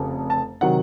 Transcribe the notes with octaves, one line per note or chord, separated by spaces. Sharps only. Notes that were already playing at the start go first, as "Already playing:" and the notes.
Already playing: F1 F2 C#3
A5
C3 D#3 F#3 F#5